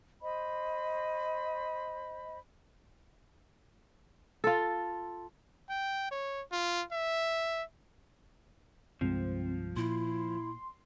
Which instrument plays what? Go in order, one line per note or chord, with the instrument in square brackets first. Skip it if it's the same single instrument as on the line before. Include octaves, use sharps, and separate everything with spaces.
[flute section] C5 D#5 B5
[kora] F4 A4
[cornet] G5
C#5
F4
E5
[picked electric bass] C2 G2 G#3 [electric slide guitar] F3 [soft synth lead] C4
[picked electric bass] A#2 [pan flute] E4 [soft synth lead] C6